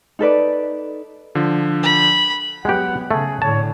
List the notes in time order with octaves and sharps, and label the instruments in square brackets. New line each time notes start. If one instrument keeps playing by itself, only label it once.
[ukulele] D#4 A4 B4 D5
[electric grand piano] D3 F3
[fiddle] B5
[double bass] F#3 B3 [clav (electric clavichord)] G#3 G4 [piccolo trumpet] F#5
[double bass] C#3 [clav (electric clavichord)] A3 [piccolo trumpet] G#4
[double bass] A2 D3 [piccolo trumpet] C#5 [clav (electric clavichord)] A5